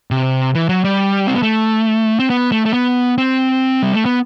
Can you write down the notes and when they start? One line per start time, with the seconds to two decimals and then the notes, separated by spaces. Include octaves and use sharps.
0.11 C3
0.55 E3
0.69 F#3
0.84 G3
1.27 C4
1.35 B3
1.43 A3
2.19 C4
2.30 B3
2.52 A3
2.65 A3
2.73 B3
3.18 C4
3.83 G3
3.94 A3
4.05 B3